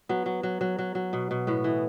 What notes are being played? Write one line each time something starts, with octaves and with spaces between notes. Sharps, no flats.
F#3 B3
F#3
F#3
F#3
F#3
F#3
B2
B2
A2 B3
E3